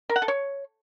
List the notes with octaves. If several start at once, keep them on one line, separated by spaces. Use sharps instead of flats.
A#4
F#5
A4
C#5